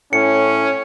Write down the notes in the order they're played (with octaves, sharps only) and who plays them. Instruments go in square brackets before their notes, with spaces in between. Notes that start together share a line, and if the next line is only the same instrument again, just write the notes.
[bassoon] A2 [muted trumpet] C#4 [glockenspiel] C#7